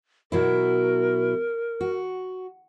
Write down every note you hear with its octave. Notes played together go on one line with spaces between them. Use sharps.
B2 F#3 E4 A#4
F#4